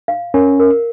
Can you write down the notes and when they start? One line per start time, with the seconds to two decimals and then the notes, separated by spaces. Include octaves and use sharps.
0.08 F5
0.34 C#4 A#4
0.60 A#4